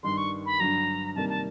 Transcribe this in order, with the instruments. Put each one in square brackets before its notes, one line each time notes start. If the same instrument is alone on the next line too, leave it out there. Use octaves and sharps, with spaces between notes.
[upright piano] G2 D#3 G3 [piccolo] C6
[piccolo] C#6
B5
[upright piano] G2 D3 F#3 [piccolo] A#5
[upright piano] C3 D#3 G3 A#3 [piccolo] A5
[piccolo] A5